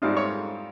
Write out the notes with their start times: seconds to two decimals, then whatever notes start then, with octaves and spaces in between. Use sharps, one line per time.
0.02 G#2 G3 C4 D#4 F4 F5
0.16 C#5 C#6